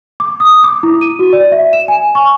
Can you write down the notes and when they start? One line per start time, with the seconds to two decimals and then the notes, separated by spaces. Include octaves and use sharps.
0.20 D6
0.40 D#6
0.64 D6
0.83 E4
1.01 D#7
1.19 F#4
1.33 D5
1.52 E5
1.73 E7
1.88 G#5
2.15 C#6